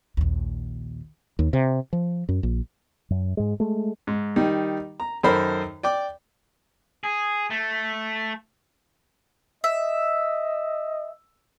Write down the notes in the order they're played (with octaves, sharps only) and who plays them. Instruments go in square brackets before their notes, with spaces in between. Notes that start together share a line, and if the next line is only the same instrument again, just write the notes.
[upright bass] A#1 D#2
[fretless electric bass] D#2
C3
F3
F#2
A#1
[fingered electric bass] F#2
G#2 G#3
G#3 A3
[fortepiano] G#2
D#3 G3 D#4
A#5
F#2 D#3 A4 A#4 C5 B5
D5 G5 D6
[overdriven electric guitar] G#4
A3
[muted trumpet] D#5 [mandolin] E5